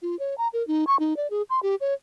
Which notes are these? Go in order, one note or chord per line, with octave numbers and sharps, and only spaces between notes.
F4
C#5
A#5
A#4
D#4
C#6
D#4
D5
G#4
C6
G4
C#5